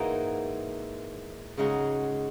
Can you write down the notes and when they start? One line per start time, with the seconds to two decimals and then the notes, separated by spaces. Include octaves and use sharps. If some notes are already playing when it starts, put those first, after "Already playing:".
Already playing: G#2 E3 A#3 D#4 F#4
1.57 C#3 G#3 D#4 F#4